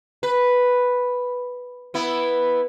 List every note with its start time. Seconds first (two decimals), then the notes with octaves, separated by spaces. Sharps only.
0.23 B4
1.94 B3 E4